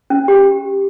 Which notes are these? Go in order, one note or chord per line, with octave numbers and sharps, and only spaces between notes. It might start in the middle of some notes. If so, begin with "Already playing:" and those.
C#4
G4